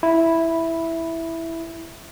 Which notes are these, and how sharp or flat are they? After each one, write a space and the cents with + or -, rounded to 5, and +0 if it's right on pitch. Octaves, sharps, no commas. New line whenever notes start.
E4 +0 B5 -5